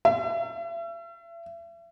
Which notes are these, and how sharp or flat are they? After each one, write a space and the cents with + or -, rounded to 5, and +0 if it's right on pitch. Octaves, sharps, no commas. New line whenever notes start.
E5 +35